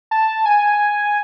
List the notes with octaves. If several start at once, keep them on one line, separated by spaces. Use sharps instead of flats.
A5
G#5